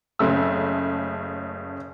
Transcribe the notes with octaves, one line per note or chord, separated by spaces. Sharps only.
F#1 C#3 A3 E6